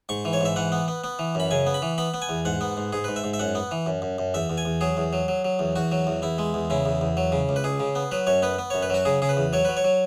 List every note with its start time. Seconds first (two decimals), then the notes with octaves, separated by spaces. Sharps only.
0.09 G#2 C#6
0.25 E3
0.33 C#5
0.41 G#2 E5
0.56 E3 F#5
0.72 B3
0.88 B3
1.04 B3
1.19 E3
1.35 F#2 B5
1.51 C#3 G#5
1.67 B3
1.74 B5
1.82 E3
1.98 B3 B5
2.14 B3
2.22 G#5
2.29 E2
2.45 G#2 F#5
2.61 B3
2.77 G#2
2.93 G#2 G#4
3.04 G#2 B4
3.16 E5
3.24 G#2
3.34 E5
3.39 F#2 F#5
3.55 B3
3.71 E3
3.86 F#2
4.02 F#2
4.19 F#2
4.34 E2 E5
4.50 E2
4.58 G#5
4.65 E2
4.81 F#3 G#4
4.97 E2
5.13 F#3
5.28 F#3
5.45 F#3
5.59 E2
5.76 E2 F#4
5.92 F#3
6.07 E2
6.22 E2 E4
6.38 G#3
6.54 E2
6.70 C#3 E4
6.85 E2
7.01 E2
7.17 F#3
7.32 C#3
7.49 C#2
7.56 B4
7.64 C#2 G#4
7.80 C#3
7.95 B3
8.11 F#3 B4
8.27 F#2 C#5
8.42 B3 B4
8.59 B3
8.70 F#2 C#5
8.82 B4
8.90 F#3 F#4
9.05 C#3 G#4
9.22 C#3 G#4
9.29 B4
9.37 E2
9.53 F#3 C#5
9.65 F#3 B4
9.77 C#5
9.84 F#3